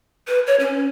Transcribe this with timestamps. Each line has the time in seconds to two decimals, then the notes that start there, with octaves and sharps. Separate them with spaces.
0.27 B4
0.47 C#5
0.60 C#4